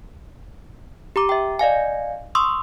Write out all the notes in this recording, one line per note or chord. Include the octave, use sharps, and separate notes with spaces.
G4 A#5 D6
E5 G5
D5 D#5 F5 G#5
C6 C#6 D#6 E6